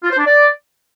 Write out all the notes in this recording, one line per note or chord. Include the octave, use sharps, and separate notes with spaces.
F4
C5
D4
D5